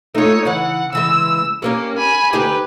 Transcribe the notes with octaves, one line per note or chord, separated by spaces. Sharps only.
A3 D#4 F4 C#5
C#3 E3 F#5
C#3 E3 G#3 E6
A#3 C#4 G4 A#4 C#5
G#5 B5
D2 D#4 G4 G#4 B4